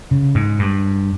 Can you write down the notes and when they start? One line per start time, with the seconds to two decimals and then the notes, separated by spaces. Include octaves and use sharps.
0.11 C#3
0.35 G#2
0.59 G2